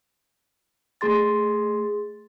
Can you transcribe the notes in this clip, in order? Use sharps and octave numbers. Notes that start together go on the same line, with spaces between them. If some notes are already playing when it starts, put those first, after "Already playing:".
A3 G#4 C6 A6